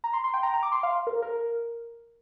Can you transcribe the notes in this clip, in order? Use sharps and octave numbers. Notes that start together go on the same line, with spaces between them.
A#5
C6
C6
G5
A#5
A#5
D6
C6
F5
A#4
A#4